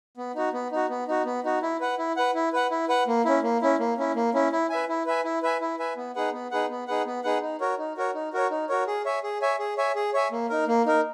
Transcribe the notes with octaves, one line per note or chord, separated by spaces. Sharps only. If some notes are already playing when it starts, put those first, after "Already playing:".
B3
D#4 F#4
B3
D#4 F#4
B3
D#4 F#4
B3
D#4 F#4
E4
B4 F#5
E4
B4 F#5
E4
B4 F#5
E4
B4 F#5
A#3
C#4 E4
A#3
C#4 E4
A#3
C#4 E4
A#3
C#4 E4
E4
B4 E5 G#5
E4
B4 E5 G#5
E4
B4 E5 G#5
E4
B4 E5 G#5
B3
D#4 G#4 B4 F#5
B3
D#4 G#4 B4 F#5
B3
D#4 G#4 B4 F#5
B3
D#4 G#4 B4 F#5
D#4
F#4 A#4 C#5
D#4
F#4 A#4 C#5
D#4
F#4 A#4 C#5
D#4
F#4 A#4 C#5
G#4
C#5 E5 G#5
G#4
C#5 E5 G#5
G#4
C#5 E5 G#5
G#4
C#5 E5 G#5
A#3
D#4 A#4
A#3
D#4 A#4